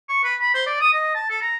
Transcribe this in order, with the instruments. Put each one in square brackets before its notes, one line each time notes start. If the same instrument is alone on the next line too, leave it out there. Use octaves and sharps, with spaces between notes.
[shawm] C#6
B4
B5
C5
D5
D#6
D#5
A5
A4
A#5